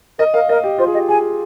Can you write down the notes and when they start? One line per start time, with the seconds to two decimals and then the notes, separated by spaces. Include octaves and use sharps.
0.19 A#4 D#5
0.34 A#4 F5
0.49 A#4 D#5
0.64 G4
0.78 F4 C5
0.87 G#4
0.94 G4 D#5
1.09 G#4 G#5